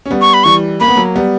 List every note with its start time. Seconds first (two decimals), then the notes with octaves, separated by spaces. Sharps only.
0.06 C#4
0.11 G3 B3
0.21 C#6
0.34 B5
0.44 E3 G3 C#6
0.80 A#3 B5
0.88 B3
0.96 F#3 A#3
1.16 G3 B3